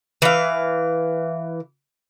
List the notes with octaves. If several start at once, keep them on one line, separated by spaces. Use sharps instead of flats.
E3 F5